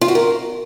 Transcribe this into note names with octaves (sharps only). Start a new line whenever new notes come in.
F4
F#4
A#4